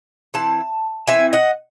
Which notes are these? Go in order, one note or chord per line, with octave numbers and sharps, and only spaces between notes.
E3 C4 E4 A5
E3 C4 E4 E5 G#5
D#5 F#5